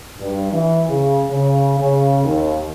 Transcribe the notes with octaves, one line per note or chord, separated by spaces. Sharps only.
G2
E3
C#3
C#3
C#3
D#2